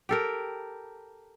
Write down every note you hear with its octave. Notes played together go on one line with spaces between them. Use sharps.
G4 A4 A#4